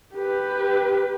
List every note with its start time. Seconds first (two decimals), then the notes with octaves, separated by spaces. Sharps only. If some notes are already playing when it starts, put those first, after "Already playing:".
0.15 G4 B4